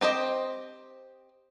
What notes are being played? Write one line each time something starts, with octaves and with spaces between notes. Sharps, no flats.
C4 G4 C5 D#5